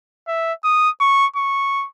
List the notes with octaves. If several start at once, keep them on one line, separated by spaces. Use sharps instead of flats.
E5
D#6
C#6
C#6